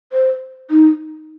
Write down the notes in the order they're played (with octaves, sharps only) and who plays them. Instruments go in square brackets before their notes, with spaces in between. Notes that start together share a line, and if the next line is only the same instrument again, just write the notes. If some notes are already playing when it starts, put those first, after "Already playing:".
[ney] C5
D#4